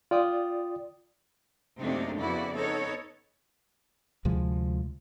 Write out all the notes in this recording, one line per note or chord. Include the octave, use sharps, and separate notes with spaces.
F4 D5 G5 D#6
F#2 C3 A3 A#3 D4 D#4
F2 C#3 B3 E4 F#4 D5
B3 D#4 A4 C#5
D2 C3 F3 G#3